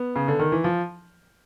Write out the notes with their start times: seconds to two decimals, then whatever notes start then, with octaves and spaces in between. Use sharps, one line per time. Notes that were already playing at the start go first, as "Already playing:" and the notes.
Already playing: B3
0.16 C#3
0.28 D3
0.39 D#3
0.52 E3
0.64 F3